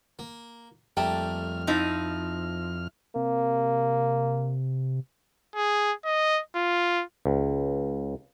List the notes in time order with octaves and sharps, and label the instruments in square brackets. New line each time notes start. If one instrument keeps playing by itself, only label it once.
[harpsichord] A#3
[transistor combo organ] F2 F6 [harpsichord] G3 A3 A#3 [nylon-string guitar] G5 [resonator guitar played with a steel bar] A5
[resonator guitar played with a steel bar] F3 C4 D#4 [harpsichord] E4
[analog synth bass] C3 [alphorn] A#3
[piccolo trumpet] G#4
D#5
F4
[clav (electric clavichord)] C#2